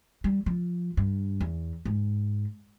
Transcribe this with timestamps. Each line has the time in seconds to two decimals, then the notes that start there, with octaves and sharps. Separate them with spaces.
0.24 G3
0.46 F3
0.97 G2
1.41 E2
1.85 G#2